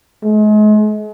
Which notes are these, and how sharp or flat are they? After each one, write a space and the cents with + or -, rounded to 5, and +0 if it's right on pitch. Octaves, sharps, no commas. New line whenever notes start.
G#3 +40